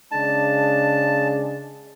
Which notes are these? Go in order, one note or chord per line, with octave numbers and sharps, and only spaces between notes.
C#3 G#3 D4 A5